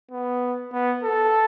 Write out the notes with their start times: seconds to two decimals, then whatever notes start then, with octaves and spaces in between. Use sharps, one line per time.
0.11 B3
0.72 B3
1.03 A4